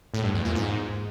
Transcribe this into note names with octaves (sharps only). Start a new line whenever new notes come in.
A2
G2
E2
A#2
G#2